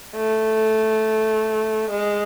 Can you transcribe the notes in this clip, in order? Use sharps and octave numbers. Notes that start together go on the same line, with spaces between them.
A3
G#3